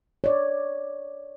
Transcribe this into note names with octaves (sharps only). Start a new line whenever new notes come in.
C#5 D5